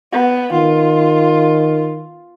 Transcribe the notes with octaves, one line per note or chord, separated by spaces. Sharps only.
B3
D#3 F4